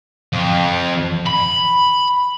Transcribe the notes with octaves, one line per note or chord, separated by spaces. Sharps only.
F2
B5